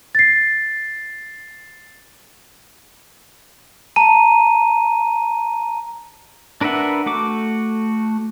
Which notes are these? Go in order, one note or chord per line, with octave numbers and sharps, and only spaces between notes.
A6 C7
A5 A#5 D#7
D4 A#4 B4 E5 F#5
A3 F#4 D6